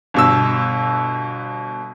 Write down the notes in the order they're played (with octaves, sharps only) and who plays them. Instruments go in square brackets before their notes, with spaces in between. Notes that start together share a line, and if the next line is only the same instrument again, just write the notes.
[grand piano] G1 B2 E6